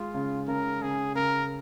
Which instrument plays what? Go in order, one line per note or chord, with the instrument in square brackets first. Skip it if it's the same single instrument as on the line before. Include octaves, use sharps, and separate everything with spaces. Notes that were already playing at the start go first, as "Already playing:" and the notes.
Already playing: [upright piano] G#3 [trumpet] F4
[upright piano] C#3
[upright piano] C#3 [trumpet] A#4
[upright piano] C#3 [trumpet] G#4
[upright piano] C#3 [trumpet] A#4